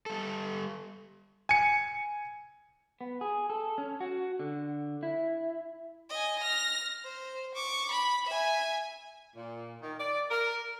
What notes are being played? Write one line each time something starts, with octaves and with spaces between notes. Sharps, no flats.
G3 A4
G#5 C#7
B3
G#4
A4
C#4
F#4
D3
E4
D#5 G#5
F6 A#6
C5
C#6 D6
B5
E5 G#5
A#2
D#3
D5
A#4